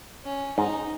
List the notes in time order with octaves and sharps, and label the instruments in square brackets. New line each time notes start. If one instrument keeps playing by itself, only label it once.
[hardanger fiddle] C#4
[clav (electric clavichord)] G#2 [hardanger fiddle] D#4